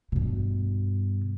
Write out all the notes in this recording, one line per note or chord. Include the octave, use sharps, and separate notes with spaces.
G2 B2